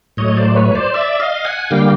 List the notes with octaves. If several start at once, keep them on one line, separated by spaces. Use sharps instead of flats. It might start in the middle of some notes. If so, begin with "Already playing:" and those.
A2 F#3 A3 C#5 D#5
C5 D5
B4 C#5
C5 D5
D5 E5
D#5 F5
F#5 G#5
D3 G3 A#3 F5 G5